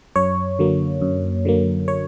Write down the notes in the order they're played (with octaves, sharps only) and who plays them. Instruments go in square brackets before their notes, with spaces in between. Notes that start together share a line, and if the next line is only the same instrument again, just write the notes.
[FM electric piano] F#2 C#5
D3 F#3 A#3
F#2
D3 F#3 A#3
C#5